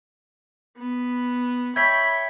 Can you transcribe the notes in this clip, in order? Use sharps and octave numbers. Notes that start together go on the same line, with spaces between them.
B3
C#5 E5 G5 B5 G#6 B6